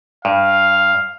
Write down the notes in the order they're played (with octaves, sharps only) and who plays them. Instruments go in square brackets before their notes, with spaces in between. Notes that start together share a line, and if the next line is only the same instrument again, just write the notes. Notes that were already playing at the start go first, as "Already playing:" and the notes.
[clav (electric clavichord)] G2 [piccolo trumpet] F5